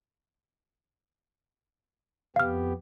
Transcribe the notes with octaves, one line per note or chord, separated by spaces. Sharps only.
F2 B3 G4 F5 F6